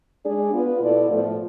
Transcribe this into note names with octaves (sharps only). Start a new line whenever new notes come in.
G#3 D4 G#4 D5
B3 F4 B4
B2 B3 E4 A4 D5
A2 F3 A3